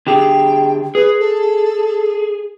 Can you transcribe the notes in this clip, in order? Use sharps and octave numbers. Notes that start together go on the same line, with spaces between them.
D3 G4 G#4 G5
G#4 B4
A4